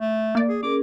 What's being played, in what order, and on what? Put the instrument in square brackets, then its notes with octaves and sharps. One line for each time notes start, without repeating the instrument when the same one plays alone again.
[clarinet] A3
[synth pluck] A#3 D5
[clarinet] G#4
[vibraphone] C#4 G#4 A#4 [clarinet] D6